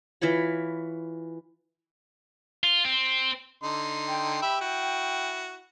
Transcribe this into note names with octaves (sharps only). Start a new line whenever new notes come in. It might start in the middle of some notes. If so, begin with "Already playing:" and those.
E3 F4 C#5 B5
F4
C4
D3 D#4 C6
G5
G4 E5 B5
E4 F#4